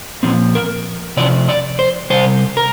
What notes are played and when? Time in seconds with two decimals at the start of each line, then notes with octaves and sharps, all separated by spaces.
0.23 A#2 F3 C4
0.55 A#4
1.17 C3 F3 D5
1.49 D5
1.79 C5
2.10 C3 G3 C5
2.57 A#4